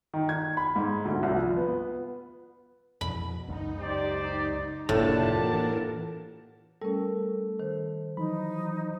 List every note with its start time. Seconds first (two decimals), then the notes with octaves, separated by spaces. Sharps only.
0.14 D#3
0.29 G#6
0.57 B5
0.76 G#2
1.05 D2
1.23 C2
1.36 F3
1.56 B3
3.01 F2 B2 E3 B5
3.48 C#2 F#2 D#4
3.80 G4 C5 D5
4.89 F1 A2 A#3 D4 F4 G4 F#5 A5
5.41 E3 A#3 D4 A#4
6.82 G3 A3 C#4 A4 A#4
7.59 D#3 C5
8.17 E3 F#3 D#4 B5